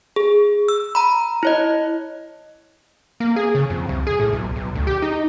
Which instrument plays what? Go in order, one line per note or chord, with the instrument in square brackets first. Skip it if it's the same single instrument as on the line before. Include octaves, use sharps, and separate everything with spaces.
[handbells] G#4
E6
A#5 B5
E4 C#5 D#5
[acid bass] A#3
G#4
C#3
F2
C2
G#4
A2
B1
B1
D2
G4
D#4